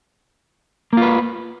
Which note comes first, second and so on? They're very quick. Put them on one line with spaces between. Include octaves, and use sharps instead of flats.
A#3 F4 B4